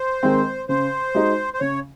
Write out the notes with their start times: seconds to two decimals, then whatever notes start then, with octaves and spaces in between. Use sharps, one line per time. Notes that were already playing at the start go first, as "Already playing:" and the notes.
Already playing: C5
0.23 D#3 G#3 C4
0.69 C#3 C5
1.15 G#3 D#4 F#4
1.54 C5
1.60 C#3 C#5